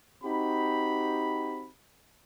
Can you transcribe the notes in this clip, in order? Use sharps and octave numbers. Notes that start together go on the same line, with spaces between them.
C4 D#4 F#4 G4 B5